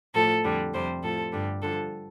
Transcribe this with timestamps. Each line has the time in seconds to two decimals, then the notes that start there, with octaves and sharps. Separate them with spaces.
0.14 A2 F3 A4
0.43 F2 D3 G3
0.73 F2 C3 G3 C5
1.03 A2 F3 A4
1.32 G2 D3 G3
1.62 G2 D3 F3 A4